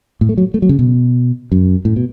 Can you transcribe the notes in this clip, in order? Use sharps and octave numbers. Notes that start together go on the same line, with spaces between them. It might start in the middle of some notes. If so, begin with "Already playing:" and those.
A2
A3
F#3
A3
F#3
C#3
B2
F#2
A2
B2